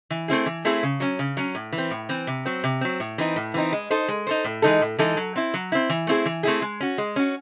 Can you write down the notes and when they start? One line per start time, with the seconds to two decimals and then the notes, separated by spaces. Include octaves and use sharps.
0.10 E3
0.28 A3 C4 E4 G#4
0.46 E3
0.65 A3 C4 E4 G#4
0.83 C#3
1.00 F#3 C#4
1.19 C#3
1.37 F#3 C#4
1.55 A2
1.73 E3
1.78 C4
1.91 A2
2.09 E3 C4
2.27 C3
2.46 F#3 C4
2.64 C3
2.81 F#3 C4
3.00 A2
3.18 E3 C4 D#4
3.36 A2
3.54 E3 C4 D#4
3.72 G#3
3.90 D#4 A4 C5
4.08 G#3
4.27 D#4 A4 C5
4.45 A2
4.62 E3 G#3 D#4 A4
4.82 A2
4.99 E3 G#3 D#4 A4
5.17 F#3
5.36 C4 E4
5.54 F#3
5.72 C4 E4
5.90 E3
6.07 A3 C4 E4 G#4
6.26 E3
6.43 A3 C4 E4 G#4
6.62 G#3
6.80 C#4 F#4
6.98 G#3
7.16 C#4 F#4